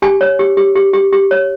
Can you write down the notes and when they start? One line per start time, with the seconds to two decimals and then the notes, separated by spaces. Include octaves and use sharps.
0.02 G4 G#5
0.21 C#5
0.39 G4
0.57 G4
0.75 G4
0.93 G4
1.13 G4
1.31 C#5